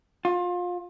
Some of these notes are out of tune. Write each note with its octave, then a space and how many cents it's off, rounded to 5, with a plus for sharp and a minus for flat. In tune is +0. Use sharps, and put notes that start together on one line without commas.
F4 +25